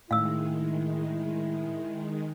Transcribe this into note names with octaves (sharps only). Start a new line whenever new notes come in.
A2 D#3 G#3 E4 F5 E6